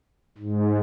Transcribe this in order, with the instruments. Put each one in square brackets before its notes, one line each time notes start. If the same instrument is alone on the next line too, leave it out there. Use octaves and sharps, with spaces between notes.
[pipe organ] G#2